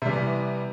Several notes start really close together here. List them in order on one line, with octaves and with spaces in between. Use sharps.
C3 G3 E3 B3